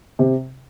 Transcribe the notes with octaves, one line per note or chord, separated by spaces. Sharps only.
C3